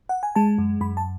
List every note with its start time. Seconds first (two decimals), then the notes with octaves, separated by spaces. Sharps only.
0.09 F#5
0.23 G#5
0.35 G#3 A5
0.58 F#2
0.81 F#2 B5
0.97 A5